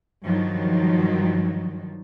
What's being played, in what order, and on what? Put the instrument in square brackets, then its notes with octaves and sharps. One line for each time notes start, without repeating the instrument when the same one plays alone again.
[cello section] G2 D#3 F3 F#3